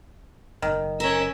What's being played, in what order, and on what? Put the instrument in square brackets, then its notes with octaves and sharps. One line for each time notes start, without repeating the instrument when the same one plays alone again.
[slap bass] F#1 F#2 [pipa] D#3
[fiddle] C#4 E5 [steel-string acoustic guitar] A#4